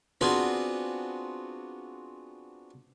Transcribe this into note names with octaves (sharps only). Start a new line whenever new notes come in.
B3 C4 D4 F4 F#4 G#4